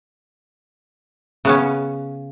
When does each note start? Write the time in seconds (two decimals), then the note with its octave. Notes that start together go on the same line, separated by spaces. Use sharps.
1.45 C#3 B3 C#4